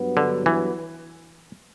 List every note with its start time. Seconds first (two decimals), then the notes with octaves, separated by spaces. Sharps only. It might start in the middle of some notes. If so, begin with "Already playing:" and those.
Already playing: G2 F#3 B3
0.17 D3
0.46 E3